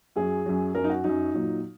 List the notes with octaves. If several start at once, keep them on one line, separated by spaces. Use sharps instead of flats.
F#2 F#3 G#4
F#2 F#3
F#2 F#3 A#4
D#4
F#4
F#2 F#3 D#4
A#2 F#3